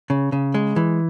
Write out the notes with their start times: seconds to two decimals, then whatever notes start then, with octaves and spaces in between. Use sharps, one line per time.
0.10 C#3
0.32 C#3
0.54 G#3
0.76 E3